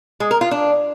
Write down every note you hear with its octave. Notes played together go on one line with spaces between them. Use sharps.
G#3
A#4
F4
D4